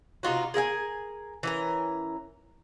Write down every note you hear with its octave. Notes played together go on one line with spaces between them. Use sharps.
C3 D#4 F4 F#4
G#4 A#4 E5 G#5
E3 C#4 A#4